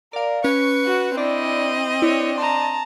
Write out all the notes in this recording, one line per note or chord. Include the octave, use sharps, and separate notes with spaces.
A#4 D5 F5
C#4 B4 C#6
F#4
C4 D4 E4 D5 D#5
D4 E4 C#5
A5 A#5 C6